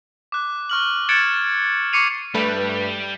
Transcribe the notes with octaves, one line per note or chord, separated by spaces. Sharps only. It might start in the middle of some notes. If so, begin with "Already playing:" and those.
D6 F#6
C#6 F6 F#7
F#6 G#6 A6 C#7 D7 E7
C#6 D6 C7 C#7 D#7 F7
G2 G3 A3 B4